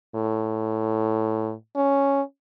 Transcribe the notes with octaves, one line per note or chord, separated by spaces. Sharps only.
A2
C#4